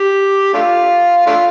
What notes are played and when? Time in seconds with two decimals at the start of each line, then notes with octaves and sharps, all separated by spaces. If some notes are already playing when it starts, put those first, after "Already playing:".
Already playing: G4
0.54 A3 D4 F4
1.26 A3 D4 F4